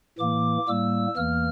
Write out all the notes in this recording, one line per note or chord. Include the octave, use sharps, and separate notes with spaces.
A2 E3 A#3 D6
A2 G3 A#3 E6
E2 E3 A#3 F6